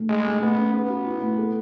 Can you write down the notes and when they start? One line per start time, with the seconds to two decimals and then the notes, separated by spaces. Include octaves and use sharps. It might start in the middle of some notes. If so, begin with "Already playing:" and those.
Already playing: A3
0.09 G#3 G#4
0.26 A3
0.41 A3 B3
0.58 C#4
0.74 B3 B4
0.90 F#4
1.06 E4
1.22 A3
1.38 A4